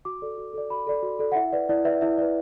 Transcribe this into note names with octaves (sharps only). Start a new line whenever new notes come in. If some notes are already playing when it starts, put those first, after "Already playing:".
F#4 D6
A4 D5
F#4
A4 D5
F#4 B5
A4 D5
F#4
A4 D5
F#5
E4 E5
B4 D5
E4 D5
B4 D5 E5
E4 E5
B4 D5